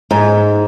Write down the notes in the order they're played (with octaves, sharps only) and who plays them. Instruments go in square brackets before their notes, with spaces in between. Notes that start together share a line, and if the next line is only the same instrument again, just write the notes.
[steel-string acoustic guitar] G#2